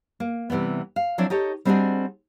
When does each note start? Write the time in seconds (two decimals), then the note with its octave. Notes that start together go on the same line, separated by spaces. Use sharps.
0.20 A#3
0.50 C3 E3 G3 B3
0.96 F5
1.18 F3 F#3 C4 D4 E4
1.30 D#4 G4 A4 C#5
1.65 G3 C4 D4 D#4 F#4 G#4